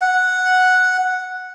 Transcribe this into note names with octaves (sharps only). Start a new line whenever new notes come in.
F#5